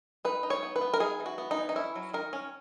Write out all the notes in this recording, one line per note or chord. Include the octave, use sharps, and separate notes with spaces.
D#4 B4
D#4
C#5
B3
B4
B3
A#4
D#4 G#4
E3
F#4
B3
D#4
E3
D#4
C#4 E4
F#3
D#3 A#4
C#4